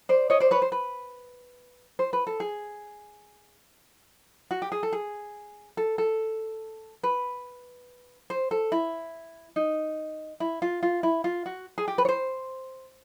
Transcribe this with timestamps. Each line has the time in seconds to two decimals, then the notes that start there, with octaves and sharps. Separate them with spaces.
0.09 C5 D5
0.30 C#5 D#5
0.40 C5 D5
0.51 B4 C#5
0.62 C5
0.72 B4
1.99 C5
2.13 B4
2.27 A4
2.40 G#4
4.51 F#4
4.62 G4
4.72 G#4
4.83 A4
4.93 G#4
5.77 A4
5.98 A4
7.03 B4
8.30 C5
8.51 A4
8.72 E4
9.56 D#4
10.40 E4
10.62 F4
10.83 F4
11.03 E4
11.24 F4
11.46 F#4
11.78 G#4
11.88 G4
11.98 B4
12.05 C#5
12.09 C5